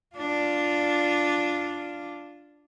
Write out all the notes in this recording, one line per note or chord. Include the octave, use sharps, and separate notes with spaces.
D4 F4